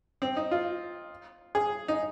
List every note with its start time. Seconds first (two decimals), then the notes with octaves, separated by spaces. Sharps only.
0.22 C4
0.36 D#4
0.51 F4
1.55 G#4
1.88 D#4